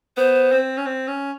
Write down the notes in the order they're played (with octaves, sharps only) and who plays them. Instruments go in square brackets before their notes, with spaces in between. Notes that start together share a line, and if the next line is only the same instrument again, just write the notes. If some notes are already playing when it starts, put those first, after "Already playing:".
[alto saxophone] B3 [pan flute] C5
[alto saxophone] C4
C#4
C4
C#4